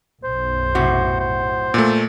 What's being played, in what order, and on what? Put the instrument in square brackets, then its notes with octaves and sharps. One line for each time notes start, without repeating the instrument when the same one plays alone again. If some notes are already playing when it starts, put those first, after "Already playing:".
[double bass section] B1 F#2 [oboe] C5
[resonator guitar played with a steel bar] A2 C3 F#4
[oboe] C5
[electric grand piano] A#2 A3